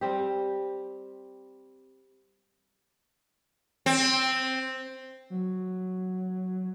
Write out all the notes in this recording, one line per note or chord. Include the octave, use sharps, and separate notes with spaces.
G3 C4 G4
C4
F#3